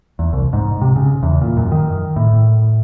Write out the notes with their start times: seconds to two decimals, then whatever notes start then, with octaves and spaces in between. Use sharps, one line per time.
0.19 E2
0.33 C2
0.53 G#2
0.81 C3
0.96 C#3
1.23 E2
1.41 A#2
1.57 F#2
1.72 D#3
2.16 A2